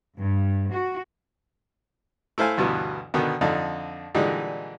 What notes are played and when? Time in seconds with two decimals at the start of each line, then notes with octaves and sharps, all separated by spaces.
0.18 G2
0.73 F#4
2.38 A3 E4 C5 F5 G#5
2.57 D2 G2 B2 E3 B3
3.14 B2 D3 D#3 B3
3.41 F2 D3 D4 D#4
4.14 A#2 D3 E3 G3 G#3 D#4